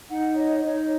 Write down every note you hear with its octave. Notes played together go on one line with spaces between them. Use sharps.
D#4 F#5
C#5 D#5
D#4 C#5